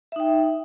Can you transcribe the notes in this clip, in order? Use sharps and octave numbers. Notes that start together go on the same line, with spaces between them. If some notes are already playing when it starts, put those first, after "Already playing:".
D#4 E5 G5